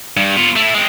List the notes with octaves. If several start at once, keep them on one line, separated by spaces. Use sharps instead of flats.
G2
B3 F4
A3 E4
G#3 C4